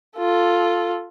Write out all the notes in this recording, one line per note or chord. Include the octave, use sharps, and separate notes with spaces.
F4 A4